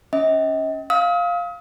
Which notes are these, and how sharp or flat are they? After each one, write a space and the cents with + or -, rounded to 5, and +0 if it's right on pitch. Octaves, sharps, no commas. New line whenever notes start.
C#4 +5 D#5 +40
F5 +5 D#6 +40